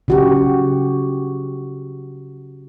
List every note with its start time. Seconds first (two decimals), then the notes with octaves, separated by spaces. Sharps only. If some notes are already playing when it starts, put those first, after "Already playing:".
0.08 C#3 F#4 G4